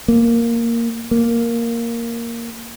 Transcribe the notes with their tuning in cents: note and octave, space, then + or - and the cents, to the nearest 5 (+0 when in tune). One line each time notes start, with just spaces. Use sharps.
A#3 -5
A#3 +0